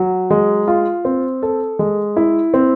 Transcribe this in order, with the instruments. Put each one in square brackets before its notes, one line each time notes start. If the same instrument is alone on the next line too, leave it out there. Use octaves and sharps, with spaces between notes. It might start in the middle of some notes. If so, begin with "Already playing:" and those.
Already playing: [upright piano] F#3
G#3
F4
C4
A4
G#3
E4
C4